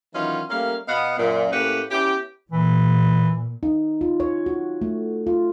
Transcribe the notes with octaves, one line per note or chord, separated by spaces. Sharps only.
D#3 E3 F#3 C#4 D#4 F4
G3 A3 A#3 C#4 A#4 F5
B2 B3 D#5 F5 F#5
F#2 A#2
A2 A#3 C#4 G4 B4 F#5
B3 C#4 E4 G4
A#2 E3
D#4
F4
C#5
F#4
A3
F4